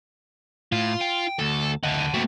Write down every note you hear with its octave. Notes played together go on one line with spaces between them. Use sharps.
A2 F4
G5
D2 A4
D2 D#4 F#5 A5
A3 A#3 C4 F#4